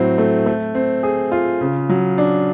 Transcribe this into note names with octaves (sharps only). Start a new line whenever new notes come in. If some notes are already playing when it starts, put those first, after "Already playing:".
Already playing: A2 F#3 C4
A3
A3
C4
G#4
F4
C#3
F#3
D4